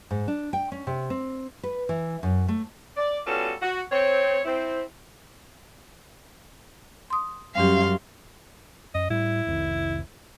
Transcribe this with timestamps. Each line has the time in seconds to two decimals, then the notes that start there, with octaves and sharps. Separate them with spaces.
0.11 G#2
0.28 D4
0.53 G5
0.72 C#4
0.87 C3
1.10 C4
1.63 B4
1.89 E3
2.23 F#2
2.48 A3
2.97 D5
3.27 G3 B3 C#4 F4 F#4 A4
3.62 F#4
3.92 C4 C#5
4.45 C4 E4
7.10 C6 D#6
7.55 F#2 G3 C#4 G4 F5 C6
8.95 F#2 D#5
9.10 A2 G3 E4
9.47 F1 C2 D#3